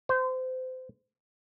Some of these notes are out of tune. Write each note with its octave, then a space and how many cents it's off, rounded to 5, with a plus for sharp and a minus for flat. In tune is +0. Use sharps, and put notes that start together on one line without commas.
C5 -30